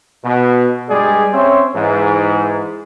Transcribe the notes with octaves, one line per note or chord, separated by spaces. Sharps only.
B2
G2 G3 G#3 G#4 D5
C4 C#4 C5 C#5 E5 C6
G#2 E3 G#3